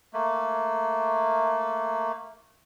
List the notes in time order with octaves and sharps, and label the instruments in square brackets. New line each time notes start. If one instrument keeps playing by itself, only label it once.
[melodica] A3 A#3